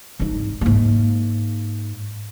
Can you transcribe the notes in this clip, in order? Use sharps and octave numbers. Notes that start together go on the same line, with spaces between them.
G#2 D#4
G#2 A#3